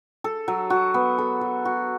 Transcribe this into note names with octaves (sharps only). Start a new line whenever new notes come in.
A4
F#3
F#4
B3
A4
F#3
F#4